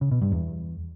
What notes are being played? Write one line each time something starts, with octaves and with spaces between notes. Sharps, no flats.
C#3
B2
G2
E2